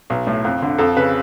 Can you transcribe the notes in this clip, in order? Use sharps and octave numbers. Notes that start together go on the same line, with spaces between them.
B1
A2
F2
D3
F2 A4
C#3 B4